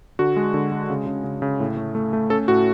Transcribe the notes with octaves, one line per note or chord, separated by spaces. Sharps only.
D3 F#4
G#3
D3
G#3
C#3
C#3
C#3
C#3
A2
A3
A3
A3
C#4 A4
A2 F#4